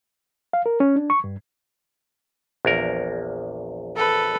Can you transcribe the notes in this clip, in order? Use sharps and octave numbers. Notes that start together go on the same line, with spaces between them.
F5
A#4
C#4
D4
C#6
G2
A#1 E2 A#4
A4 B4